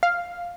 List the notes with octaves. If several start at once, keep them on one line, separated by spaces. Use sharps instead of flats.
F5